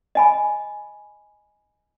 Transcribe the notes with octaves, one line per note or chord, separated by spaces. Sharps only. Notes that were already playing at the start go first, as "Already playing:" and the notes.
D#5 G#5 B5